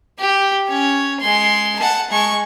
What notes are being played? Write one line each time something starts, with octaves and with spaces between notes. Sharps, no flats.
G4
C#4 C#5
G#3 C6
F#5 A5
G#3 C#6